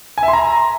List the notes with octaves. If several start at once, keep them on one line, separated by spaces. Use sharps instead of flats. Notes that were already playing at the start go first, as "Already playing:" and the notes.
G#5
E5
C6
A#5